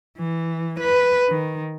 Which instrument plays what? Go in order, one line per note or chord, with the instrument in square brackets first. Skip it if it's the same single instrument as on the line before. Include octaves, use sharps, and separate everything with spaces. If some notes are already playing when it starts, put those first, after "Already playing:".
[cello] E3
B4
D#3